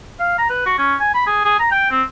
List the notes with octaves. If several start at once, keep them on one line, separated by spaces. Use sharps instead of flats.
F5
A#5
B4
F#4
C#4
G#5
B5
G#4
G#4
A#5
G5
C4